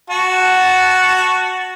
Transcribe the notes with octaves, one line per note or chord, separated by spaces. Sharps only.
F#4 F#5 A5